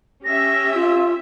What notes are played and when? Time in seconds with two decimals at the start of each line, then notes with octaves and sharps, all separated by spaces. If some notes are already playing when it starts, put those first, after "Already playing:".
0.25 C#4 G4 E5 A#6
0.74 F4